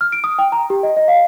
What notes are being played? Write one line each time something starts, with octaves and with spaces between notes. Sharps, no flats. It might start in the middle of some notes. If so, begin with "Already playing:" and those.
F6
D7
D#6
G5
A#5
G4
D#5
D#5
F5